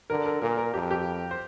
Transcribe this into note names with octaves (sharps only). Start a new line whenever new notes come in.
D3 A#4
A#4
A#2 A#4
A#4
F2 G4
G4
C5